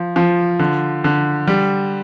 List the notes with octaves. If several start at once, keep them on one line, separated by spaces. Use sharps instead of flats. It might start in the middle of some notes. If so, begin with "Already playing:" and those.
Already playing: F3
F3
D3
D3
G3